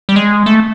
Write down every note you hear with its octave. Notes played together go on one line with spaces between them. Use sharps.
G3
G#3
A3